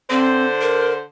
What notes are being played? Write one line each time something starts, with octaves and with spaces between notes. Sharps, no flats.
D3 C4 C5
A#4